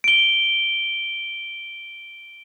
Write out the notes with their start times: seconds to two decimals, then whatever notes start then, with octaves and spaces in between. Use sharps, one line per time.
0.04 D7 G7